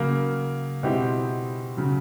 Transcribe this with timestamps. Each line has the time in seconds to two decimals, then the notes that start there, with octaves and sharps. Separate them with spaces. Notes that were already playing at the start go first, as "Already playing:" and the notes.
Already playing: C#3 F#3 A#3
0.83 B2 G#3 C4 E4 G4
1.77 C#3 F#3